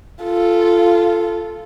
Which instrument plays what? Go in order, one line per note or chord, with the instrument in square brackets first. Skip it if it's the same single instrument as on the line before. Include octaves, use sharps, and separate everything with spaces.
[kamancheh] F4 A4